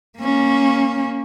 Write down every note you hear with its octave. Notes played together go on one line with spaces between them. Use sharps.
A#3 C#4